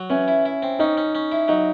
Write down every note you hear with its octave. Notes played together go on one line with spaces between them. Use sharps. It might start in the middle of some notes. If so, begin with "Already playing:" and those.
Already playing: F#3
E3 C#4
E4
E4
C4
C#4 D#4
C#4
C#4
E4
F#3 D#4